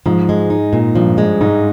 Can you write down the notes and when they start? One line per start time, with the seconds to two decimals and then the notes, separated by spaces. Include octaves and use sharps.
0.06 G#2 F3
0.29 G#3
0.50 D#4
0.73 A#2
0.95 G2 F3
1.18 G#3
1.41 G#2 D#4